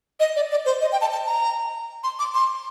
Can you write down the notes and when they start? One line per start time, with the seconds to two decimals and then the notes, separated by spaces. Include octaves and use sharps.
0.20 D#5
0.36 D5
0.51 D5
0.65 C5
0.81 D#5
0.92 G5
1.01 A5
1.12 A5
1.27 A#5
2.04 C6
2.19 D6
2.34 C6